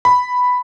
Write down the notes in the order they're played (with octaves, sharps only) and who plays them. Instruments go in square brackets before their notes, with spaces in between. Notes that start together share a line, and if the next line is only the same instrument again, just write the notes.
[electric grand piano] B5